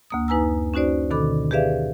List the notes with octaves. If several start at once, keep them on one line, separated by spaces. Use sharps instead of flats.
D2 A#3 D#6
F#2 D#4 B4 G#5 A#5 E6
C#4 D#4 F#4 C5 D5
B2 D3 D#3 A4 B5 D6
G4 G#4 B4 D5 E5 F5